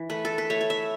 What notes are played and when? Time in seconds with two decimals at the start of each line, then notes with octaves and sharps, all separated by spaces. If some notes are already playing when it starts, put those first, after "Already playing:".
Already playing: E3
0.10 A3 B4
0.25 A4
0.38 B4
0.50 A3 C#5
0.61 C#5
0.70 E5